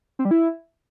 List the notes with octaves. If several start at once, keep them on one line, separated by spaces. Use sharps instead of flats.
C4
G3
E4